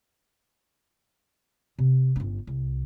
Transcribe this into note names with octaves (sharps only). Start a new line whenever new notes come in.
C3
G1 C#4
C2